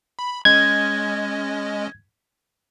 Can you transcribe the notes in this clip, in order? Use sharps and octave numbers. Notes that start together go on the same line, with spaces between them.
B5
G#3 C#4 D#5 G#6